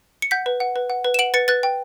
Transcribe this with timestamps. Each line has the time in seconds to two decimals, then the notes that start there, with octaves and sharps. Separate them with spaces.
0.22 C#7
0.31 F#5 G6 B6
0.46 B4
0.60 F#5
0.76 B4
0.90 F#5
1.05 B4
1.14 E7
1.19 F#5 D7 F#7
1.34 B4 A6 C#7
1.48 B4 F#6 A6
1.63 G5